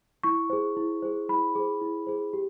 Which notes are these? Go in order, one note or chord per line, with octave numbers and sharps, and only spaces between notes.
E4 C#6
G#4 C5
E4
G#4 C5
E4 B5
G#4 C5
E4
G#4 C5
G4